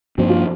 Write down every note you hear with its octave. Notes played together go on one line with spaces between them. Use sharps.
G2 F3 A#3 C4 D4
F4